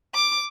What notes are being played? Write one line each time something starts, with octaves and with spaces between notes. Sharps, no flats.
D6